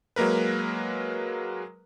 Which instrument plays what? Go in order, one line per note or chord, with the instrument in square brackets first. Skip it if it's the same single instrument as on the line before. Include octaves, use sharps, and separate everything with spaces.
[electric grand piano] F#3 G#3 A#3 A#4 B4